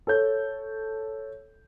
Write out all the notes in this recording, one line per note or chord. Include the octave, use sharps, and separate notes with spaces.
A4 C#5 G6